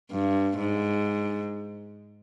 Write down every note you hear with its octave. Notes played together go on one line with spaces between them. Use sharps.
G2
G#2